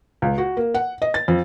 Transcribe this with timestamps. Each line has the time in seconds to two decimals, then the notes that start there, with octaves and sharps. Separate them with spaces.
0.22 C#2
0.38 F#4
0.57 A#3
0.74 F#5
1.02 D#5
1.14 A6
1.28 F2